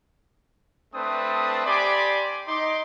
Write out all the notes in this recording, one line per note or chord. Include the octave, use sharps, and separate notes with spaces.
A3 C4 D4 B4 A5 D#6
G4 D5 G#5 B5 C6 D6
D#4 C6 D6